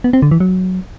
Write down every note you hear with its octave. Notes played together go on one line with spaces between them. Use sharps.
B3
C4
D3
E3
F#3